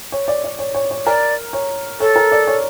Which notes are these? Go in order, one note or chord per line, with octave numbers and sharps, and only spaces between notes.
C#5
D5
D5
C#5
C#5
C#5
A#4 D5
C#5
A4 C#5
A#4
D5
C#5